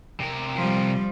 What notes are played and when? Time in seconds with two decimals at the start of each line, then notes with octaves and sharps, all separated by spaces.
0.20 C3 A#4
0.55 F3 G3